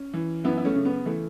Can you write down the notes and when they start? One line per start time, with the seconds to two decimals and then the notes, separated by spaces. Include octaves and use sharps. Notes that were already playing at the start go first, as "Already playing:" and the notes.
Already playing: C#4
0.14 E3
0.44 F#2 B3 E4
0.58 E4
0.65 A3 C#4
0.75 C#3
0.85 B3
1.06 E3 A3